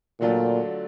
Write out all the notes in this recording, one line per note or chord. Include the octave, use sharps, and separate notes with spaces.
A#2 D3 F#3 A3 D4 F4